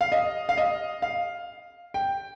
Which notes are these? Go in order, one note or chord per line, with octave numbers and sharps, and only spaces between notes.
F5
D#5
F5
D#5
F5
G5